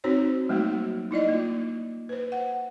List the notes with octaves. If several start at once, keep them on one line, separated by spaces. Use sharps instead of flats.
C4 D#4 F#4 C5 C#5
F#3 G3 A3 A#3 D#4 F#4
D#4 E4 D5 D#5
A#3 F4
B4 C5
F#5